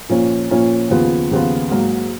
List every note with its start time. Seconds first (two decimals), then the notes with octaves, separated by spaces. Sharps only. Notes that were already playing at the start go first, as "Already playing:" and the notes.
0.09 A#2 F3 A#3 C#4
0.50 A#2 F3 A#3 C#4
0.90 D#2 C#3 F3 B3 F4
1.31 D#2 C#3 F3 B3 F4
1.71 G#2 F#3 A#3